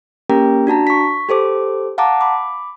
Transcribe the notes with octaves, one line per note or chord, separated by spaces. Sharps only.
A#3 C#4 G4 A#4 G5 A#5
D4 F#4 A5 A#5
C#6 B6
G4 A4 C5 D6
F5 F#5 A5 A#5 D6
B5 D6